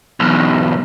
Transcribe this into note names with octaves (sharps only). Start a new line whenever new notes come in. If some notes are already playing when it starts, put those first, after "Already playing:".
B1 E2